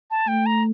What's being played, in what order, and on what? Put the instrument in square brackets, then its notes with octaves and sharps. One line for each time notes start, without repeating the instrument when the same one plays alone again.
[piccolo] A5
[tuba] A3 [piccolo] G5
[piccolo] A#5